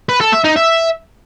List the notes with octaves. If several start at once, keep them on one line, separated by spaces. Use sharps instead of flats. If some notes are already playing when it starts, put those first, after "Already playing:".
B4
A4
E5
D#4
E5